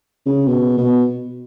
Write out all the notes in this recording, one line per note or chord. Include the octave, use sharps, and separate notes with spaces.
C#3
B2
B2